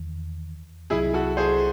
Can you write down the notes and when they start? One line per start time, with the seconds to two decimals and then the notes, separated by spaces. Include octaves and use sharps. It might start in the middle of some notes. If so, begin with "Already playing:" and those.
Already playing: E2 D#3
0.90 C2 C3 F#3 C4 E4 G#4
1.14 F#4 A4
1.37 G#4 C5